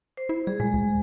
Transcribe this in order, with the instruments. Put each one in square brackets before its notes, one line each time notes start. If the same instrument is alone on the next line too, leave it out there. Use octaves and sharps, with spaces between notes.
[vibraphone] C5
[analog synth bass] E4
[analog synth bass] G3 [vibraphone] G#4
[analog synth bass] A#2 [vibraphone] G#3
[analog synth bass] D2